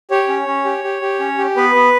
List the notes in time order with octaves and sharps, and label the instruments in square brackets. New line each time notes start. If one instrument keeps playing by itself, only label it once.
[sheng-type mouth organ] G4 C#5
C#4
C#4
G4
G4
G4
C#4
G4
B3 B4
B3